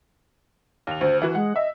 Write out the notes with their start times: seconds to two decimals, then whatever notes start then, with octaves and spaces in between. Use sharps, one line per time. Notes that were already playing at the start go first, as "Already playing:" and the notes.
0.87 D#2 F7
1.01 D2 C5
1.22 E3 F#4 B4
1.35 G#3 F#5
1.56 D#5 E5